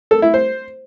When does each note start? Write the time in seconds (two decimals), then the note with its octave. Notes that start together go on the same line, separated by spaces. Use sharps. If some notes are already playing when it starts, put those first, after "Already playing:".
0.11 A4
0.22 E4
0.34 C5